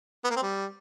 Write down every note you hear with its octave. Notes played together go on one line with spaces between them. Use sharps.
B3
A#3
C4
G3